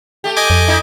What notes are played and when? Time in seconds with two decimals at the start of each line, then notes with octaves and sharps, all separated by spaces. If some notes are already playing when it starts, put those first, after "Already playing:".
0.24 A3 G4
0.37 D#5 G#5 D6
0.50 F2
0.68 D#4 E4